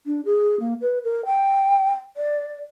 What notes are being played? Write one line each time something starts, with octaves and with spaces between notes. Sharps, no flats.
D4
G#4
A#3
B4
A#4
G5
D5